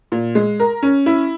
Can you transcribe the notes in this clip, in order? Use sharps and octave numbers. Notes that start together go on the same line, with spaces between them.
A#2
G#3
A#4
C#4
E4